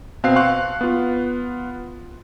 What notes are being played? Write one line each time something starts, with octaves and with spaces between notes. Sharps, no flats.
B2 C4 F5 F#6 C7
F5 C6 C#6 F#6
B3 F4